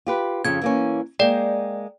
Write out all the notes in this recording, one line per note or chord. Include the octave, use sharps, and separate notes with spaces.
F4 G4 B4
F2 C#3 G#6
E3 A#3 C#4
G#3 A#3 D5 G5